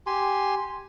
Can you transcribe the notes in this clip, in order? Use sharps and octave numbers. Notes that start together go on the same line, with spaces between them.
G4 G#5 C6